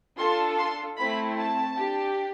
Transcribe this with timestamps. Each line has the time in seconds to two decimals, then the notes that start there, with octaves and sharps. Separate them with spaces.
0.18 D4 F4 A4 C6
0.58 C6
0.97 A3 C4 E4 B5
1.37 A5
1.77 D4 G4